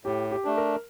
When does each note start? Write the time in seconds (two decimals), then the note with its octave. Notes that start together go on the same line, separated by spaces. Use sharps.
0.05 A2 G4
0.31 G4
0.45 A3 D4
0.58 A#4